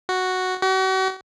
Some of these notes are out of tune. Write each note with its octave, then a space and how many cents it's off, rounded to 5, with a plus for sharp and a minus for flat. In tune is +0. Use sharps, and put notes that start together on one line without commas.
F#4 +0
F#4 +40